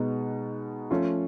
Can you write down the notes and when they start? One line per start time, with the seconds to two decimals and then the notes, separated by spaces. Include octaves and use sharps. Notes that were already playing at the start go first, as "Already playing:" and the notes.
Already playing: B2 G#3 B3 D#4
0.91 F3 A3 C#4 F4